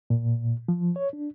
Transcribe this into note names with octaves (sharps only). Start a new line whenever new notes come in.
A#2
F3
C#5
D4